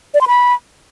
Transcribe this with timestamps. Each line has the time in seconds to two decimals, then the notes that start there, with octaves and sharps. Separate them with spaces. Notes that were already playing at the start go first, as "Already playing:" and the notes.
0.14 D5
0.21 C6
0.28 B5